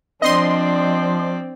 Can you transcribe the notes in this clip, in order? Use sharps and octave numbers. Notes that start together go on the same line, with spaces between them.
F3 C4 D4 D5 D#5 C6